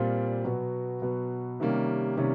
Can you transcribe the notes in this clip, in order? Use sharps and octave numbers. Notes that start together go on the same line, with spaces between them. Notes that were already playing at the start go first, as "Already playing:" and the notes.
Already playing: A#2 G3 C4 F4
B2 F#3 B3
B2 F#3 B3
C3 D#3 G3 A#3 C#4
C3 D#3 G3 A#3 C#4